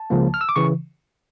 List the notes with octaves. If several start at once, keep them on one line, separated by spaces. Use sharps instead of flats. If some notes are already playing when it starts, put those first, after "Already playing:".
Already playing: A5
C#2 C#3 F3 A#3
F6
E6
D6
C#3 E3 C#6